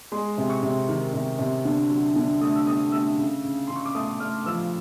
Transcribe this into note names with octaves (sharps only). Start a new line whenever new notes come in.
G#3 C6
C3
C#6
C3
D#3
C3
C3
D3
F#3
D3
A3 D#6
E6
A3 D#6
A3 E6
C#3
C#3
C#3 C6
C#6
D6
A3 D#6
A3 F6
F3 E6